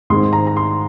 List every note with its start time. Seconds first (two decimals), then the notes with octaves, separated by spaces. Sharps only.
0.10 G#2 D#3 G#3 C4 C6
0.33 A#5
0.47 A#5
0.57 C6